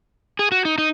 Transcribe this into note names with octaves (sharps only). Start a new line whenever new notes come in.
G#4
F#4
D#4
D#4